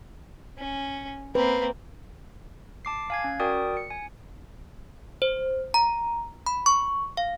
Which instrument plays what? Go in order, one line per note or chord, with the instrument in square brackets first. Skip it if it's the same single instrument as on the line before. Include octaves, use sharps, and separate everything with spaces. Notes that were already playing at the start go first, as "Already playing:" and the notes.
[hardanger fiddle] C#4
[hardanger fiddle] A#3 C4 [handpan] B4
[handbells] A5 D6 C7
F5 G#5 G#6
C#4
F#4 A#4 D5 G5 D#6
C#7
G#5
C5
A#5
B5
C#6
F5